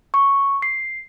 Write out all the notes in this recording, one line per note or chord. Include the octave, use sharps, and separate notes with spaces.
C#6
C7